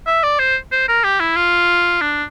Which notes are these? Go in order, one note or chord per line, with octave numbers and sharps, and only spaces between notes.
E5
D5
C5
C5
A#4
G4
E4
F4
D4